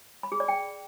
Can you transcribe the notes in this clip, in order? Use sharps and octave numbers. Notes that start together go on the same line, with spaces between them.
B5
G#4
D5
G5